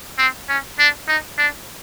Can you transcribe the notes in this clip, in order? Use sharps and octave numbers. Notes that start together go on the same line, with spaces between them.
C4
C#4
D4
D#4
D4